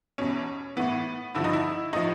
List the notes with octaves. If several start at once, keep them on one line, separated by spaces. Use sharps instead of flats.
E2 B2 C#4
A2 E3 B3
G2 D3 F3 E4
D#4
E4
A2 F3 D#4